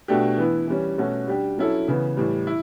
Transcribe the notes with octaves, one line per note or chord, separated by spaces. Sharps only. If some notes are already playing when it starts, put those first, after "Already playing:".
B2 A3 D4 G4
E3 B3 E4
E3 G3 C#4
B2 A3 C#4 F#4
G3 D4 G4
F#3 C#4 E4 A4
C#3 E3 B3
A2 E3 G3
E4